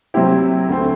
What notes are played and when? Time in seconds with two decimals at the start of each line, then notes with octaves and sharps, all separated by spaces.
0.14 C3 F#3 C4 E4 G4
0.69 D2 D3 A3 C4